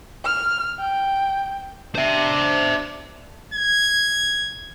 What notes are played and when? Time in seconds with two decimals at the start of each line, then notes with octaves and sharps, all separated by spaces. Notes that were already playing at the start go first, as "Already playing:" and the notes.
0.24 F6
0.79 G5
1.95 D4 C5 E5
3.54 G#6